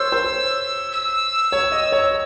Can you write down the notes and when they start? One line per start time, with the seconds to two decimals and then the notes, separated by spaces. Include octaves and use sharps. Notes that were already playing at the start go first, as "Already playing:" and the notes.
Already playing: C5 C#5 E6
0.12 C5
0.92 E6
1.52 C#5
1.72 D#5
1.92 C#5